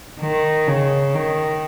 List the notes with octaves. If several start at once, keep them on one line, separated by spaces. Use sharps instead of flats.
D#3
C#3
D#3